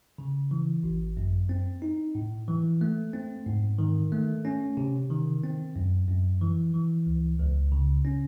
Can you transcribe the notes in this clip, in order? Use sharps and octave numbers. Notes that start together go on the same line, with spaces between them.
C#3
E3
G#1
F#2
C4
D#4
A2
E3
A3
C4
G#2
D#3
A3
C#4
C3
D#3
C4
F#2
F#2
E3
E3
C#2
C#2
C#3
C#4